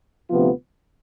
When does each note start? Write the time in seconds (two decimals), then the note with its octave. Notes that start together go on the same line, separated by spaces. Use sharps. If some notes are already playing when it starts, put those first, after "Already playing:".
0.30 D2 C3 F3 B3 F4